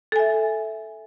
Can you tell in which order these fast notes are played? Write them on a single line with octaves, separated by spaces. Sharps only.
A4 G#5 E5